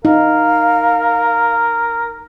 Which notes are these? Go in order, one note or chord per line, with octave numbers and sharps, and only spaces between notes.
D#4 A#4 F5